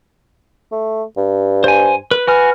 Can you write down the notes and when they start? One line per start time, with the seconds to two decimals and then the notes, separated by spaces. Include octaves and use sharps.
0.72 A3
1.17 G2
1.64 C5 G#5
2.11 B4
2.27 F#4 B4 G#5 F6